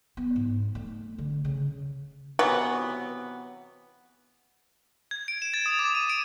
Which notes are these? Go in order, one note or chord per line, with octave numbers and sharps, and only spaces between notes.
B3
G#2
A3
D3
C#3
C3 E3 F#3 B3
G#6
D7
E7
A6
D#6
D6
D#7
D7